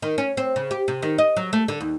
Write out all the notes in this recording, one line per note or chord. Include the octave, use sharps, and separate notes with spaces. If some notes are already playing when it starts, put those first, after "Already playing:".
D#3
C#4
C4
C#3
G4
C3
D#3
D#5
F#3
A3
D3
D#2